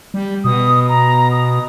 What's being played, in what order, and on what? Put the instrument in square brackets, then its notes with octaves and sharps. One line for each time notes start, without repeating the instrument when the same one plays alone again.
[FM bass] G3
[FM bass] B2 [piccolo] D#6
[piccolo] A#5
D#6